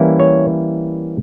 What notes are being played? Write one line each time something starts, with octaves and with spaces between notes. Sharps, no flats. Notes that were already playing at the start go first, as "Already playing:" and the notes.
Already playing: E3 G3 A#3 C#4 E4
C#5